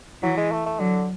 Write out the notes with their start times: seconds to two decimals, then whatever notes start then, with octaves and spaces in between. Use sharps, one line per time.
0.23 E3 F#3
0.37 G#3
0.52 A3
0.66 A3
0.80 D3 F#3